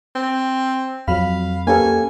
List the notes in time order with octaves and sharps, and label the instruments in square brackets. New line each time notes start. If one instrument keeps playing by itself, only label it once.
[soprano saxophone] C4
[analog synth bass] F2 [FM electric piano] F3 F#3 B5 [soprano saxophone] F5
[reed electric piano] A#3 C#4 A4 [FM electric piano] G4 B4 F5 [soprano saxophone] G#5